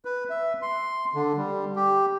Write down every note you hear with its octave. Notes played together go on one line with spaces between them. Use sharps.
B4
E5
C6
D3
G3
G4